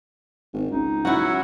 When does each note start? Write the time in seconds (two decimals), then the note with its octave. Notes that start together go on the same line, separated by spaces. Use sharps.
0.54 G#1
0.71 C#2 D#4
1.05 F#3 C#4 E4 F#4 F#5